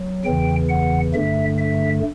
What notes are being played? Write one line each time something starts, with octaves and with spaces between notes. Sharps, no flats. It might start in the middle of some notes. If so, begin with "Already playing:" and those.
Already playing: F#3
E2 C#3 E3 G5
F#5
G2 D3 A3 E5
E5